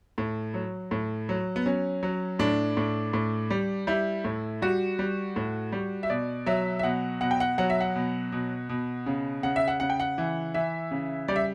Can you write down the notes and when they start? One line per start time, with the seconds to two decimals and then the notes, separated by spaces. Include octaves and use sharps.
0.18 A2
0.54 F#3
0.91 A2
1.29 F#3
1.56 B3
1.66 F#3 C#4
2.03 F#3
2.39 A2 D4
2.77 A2
3.13 A2
3.50 G3
3.87 G3 E4
4.24 A2
4.62 G3 F#4
4.99 G3
5.36 A2
5.72 G3
6.03 E5
6.10 B2 D5
6.46 F#3 E5
6.79 E5
6.83 B2 F#5
7.21 B2 F#5
7.31 G5
7.40 F#5
7.58 F#3 F#5
7.70 E5
7.81 F#5
7.96 B2
8.32 B2
8.69 B2
9.06 C#3
9.43 C#3 F#5
9.56 E5
9.68 F#5
9.80 C#3 F#5
9.90 G5
10.00 F#5
10.18 E3
10.54 E3 E5
10.91 C#3
11.28 G3 D5
11.36 E5